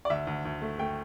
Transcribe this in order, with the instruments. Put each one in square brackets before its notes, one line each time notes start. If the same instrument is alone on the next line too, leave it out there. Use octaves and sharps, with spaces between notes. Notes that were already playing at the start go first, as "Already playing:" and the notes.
[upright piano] D5
D2 E5
D2
D2
A3
A3 G5